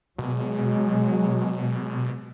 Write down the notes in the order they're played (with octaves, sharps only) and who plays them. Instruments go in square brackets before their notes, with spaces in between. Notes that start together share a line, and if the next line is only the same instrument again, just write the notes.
[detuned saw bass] B2 [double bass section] F#3 G#3